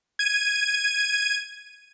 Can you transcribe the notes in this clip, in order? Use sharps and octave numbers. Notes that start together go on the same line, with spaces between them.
G#6 D#7